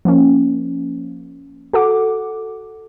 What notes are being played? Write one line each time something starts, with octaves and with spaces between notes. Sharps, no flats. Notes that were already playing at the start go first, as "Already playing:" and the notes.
F3 A#3 C#4
F#4 A4 F#5 D6